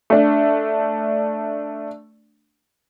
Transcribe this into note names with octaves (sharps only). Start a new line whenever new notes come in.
A3 D4